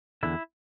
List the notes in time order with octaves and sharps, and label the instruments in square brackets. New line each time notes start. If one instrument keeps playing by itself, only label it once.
[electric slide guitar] E2 D3 E4